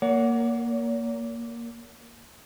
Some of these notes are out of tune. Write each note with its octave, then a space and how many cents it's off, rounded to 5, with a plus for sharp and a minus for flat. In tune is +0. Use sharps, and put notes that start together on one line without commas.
A#3 +0 C#5 +40 F#5 +0